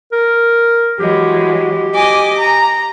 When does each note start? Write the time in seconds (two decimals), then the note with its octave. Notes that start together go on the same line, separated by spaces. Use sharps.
0.12 A#4
1.00 E3 F#3 G#3 G4
1.94 D#5 G#5 D6
2.38 A#5